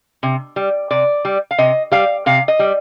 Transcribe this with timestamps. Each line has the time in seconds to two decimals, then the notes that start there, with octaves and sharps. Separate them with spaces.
0.23 C3
0.56 G3
0.91 C3 D5
1.25 G3
1.51 F5
1.58 C3 D#5
1.92 G3 F5
2.26 C3 F5
2.48 D#5
2.59 G3